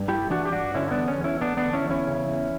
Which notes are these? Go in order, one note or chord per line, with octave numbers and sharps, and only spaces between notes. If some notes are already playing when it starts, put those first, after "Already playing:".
Already playing: G2
A3 E4 G4
E3 D4 F#4
G4
G2 D4 F#4
D3 C#4 E4
E4
B3 D4
E2
C#4
E2
C#4 E4
A3 B3 D4
B3 D4
D3
C#4 E4
E2
C#4 E4
C#3
E2